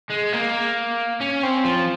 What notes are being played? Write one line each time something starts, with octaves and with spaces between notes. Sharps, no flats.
G#3
A#3
C#4
C4
F3